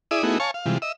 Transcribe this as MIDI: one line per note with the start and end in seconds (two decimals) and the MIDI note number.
0.11 0.23 64
0.11 0.23 68
0.11 0.23 74
0.11 0.23 76
0.11 0.23 87
0.23 0.38 57
0.23 0.38 59
0.23 0.38 63
0.23 0.38 64
0.23 0.38 66
0.23 0.38 68
0.40 0.51 73
0.40 0.51 77
0.40 0.51 80
0.40 0.51 81
0.40 0.51 85
0.54 0.65 77
0.66 0.78 48
0.66 0.78 52
0.66 0.78 55
0.66 0.78 56
0.66 0.78 65
0.82 0.92 75
0.82 0.92 76
0.82 0.92 88